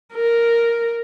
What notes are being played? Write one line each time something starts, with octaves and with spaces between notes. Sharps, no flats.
A#4